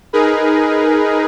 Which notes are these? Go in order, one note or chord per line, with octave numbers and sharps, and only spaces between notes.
D#4 G#4 A#4 B4